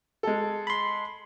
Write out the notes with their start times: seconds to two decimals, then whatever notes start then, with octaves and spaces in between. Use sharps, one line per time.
0.23 G#3 A4
0.67 B5 C6